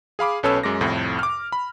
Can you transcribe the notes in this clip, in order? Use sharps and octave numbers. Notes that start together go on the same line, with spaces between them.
G#4 F5 B5 D6
B1 C#4 A4 B4 C#5 E6
F#2 G#3 D6 A#6
C2 F2 A2
D6 F6
B5